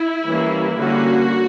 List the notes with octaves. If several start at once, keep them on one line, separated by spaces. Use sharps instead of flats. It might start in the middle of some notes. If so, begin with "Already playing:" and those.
Already playing: E4
E3 G3 A#3 C#4
D3 G3 A#3 C#4 F#4